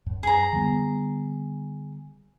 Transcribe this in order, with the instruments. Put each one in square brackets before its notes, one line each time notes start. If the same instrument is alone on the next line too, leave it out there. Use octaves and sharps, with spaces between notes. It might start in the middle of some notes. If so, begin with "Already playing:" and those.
[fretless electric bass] F#2
[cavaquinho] G#4 A#5
[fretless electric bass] D3 G3 B3